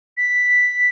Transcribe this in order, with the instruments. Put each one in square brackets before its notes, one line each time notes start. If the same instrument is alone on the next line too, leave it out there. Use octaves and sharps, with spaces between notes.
[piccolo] B6